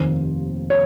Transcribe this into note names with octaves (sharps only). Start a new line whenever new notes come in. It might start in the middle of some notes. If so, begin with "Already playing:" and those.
Already playing: F1 D#2 D#3 C5
C#5